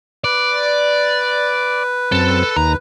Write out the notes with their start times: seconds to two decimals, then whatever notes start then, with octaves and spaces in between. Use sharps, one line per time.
0.24 B4 D5
2.12 F#2 C4 A4
2.57 D#2 A#5